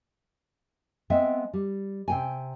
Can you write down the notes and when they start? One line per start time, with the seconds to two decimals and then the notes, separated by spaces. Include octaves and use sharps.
1.10 G#3 B3 C4 E5 G5
1.53 G3
2.08 C3 G5 G#5